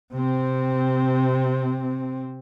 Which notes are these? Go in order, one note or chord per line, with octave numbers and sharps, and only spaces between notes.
C3 C4